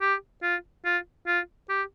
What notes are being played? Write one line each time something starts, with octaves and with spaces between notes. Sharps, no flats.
G4
F4
F4
F4
G4